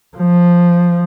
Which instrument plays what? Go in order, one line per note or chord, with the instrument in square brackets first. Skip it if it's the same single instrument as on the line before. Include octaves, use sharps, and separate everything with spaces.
[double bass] F3